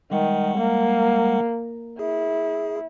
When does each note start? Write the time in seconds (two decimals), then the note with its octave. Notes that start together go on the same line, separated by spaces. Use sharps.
0.11 D#3 G3 G#3 F#5
0.58 A#3
1.99 E4 G#4